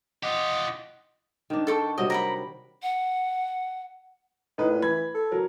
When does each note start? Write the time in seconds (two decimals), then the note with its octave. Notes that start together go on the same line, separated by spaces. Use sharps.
0.23 F4 G4 D#5 F#5
1.50 D#3 D4
1.67 A4 G5 C#6
1.98 C3 F#3 G3 D#5
2.10 A#4 F#5 B5
2.83 F#5
4.58 A2 D#4 B4
4.70 A#2
4.82 E3 B5 G#6
5.15 A4
5.32 F#3 A#4